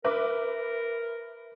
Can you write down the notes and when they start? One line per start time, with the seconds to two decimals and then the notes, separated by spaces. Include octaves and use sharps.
0.04 A#4 B4 E5 D6